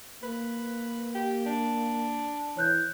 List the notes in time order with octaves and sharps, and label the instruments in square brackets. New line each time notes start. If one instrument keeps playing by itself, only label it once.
[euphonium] A#3 [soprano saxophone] B4
[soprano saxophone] G4
D4
[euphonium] E3 [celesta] C#5 F#6 G6